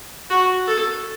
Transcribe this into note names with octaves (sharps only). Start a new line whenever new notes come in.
F#4
A4